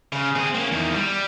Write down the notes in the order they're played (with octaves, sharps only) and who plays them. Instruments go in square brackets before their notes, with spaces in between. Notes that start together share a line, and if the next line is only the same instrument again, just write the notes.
[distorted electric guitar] C#3
C4 G#4
A#3 C#4
E2 D#3
G3